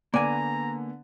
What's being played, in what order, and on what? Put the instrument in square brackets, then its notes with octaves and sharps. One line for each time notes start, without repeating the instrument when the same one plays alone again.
[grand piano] D3 B3 [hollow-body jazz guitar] A#3 G#5 [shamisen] D5 [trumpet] A#5